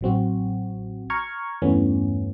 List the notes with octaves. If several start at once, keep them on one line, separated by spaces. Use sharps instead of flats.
A1 F#3 C4 F#4
A#5 C#6 F6 G#6
E2 G2 E3 A3 B3 C#4